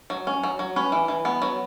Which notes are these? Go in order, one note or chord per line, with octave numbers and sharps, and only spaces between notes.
F#3
C#4
F#3
F#3
C#4 B4
E3
E3
B3
F#3